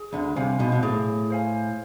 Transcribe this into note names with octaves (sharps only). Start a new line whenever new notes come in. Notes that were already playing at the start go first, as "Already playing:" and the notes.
Already playing: G#4
D2 D3
C2 C3 C5 F5 G#5
B1 B2
B2
A2 G#4
C5 F5 G#5